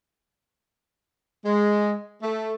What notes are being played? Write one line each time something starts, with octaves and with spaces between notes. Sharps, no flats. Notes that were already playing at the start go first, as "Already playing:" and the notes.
G#3
A3